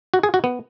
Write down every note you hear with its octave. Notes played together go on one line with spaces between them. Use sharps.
F#4
G#4
F#4
B3